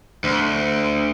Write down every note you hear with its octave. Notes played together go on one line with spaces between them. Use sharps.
D2